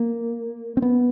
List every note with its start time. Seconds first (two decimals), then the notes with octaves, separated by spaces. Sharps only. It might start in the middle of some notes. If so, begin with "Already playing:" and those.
Already playing: A#3
0.77 C4
0.82 B3